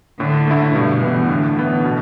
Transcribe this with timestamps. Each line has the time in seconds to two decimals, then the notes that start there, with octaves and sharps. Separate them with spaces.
0.20 A2 D3
0.47 A3 E4
0.75 G2 B2
1.02 E3 B3
1.29 A2 D3
1.56 E3 B3
1.84 B2